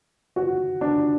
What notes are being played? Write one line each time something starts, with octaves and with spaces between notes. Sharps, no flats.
F#4
D4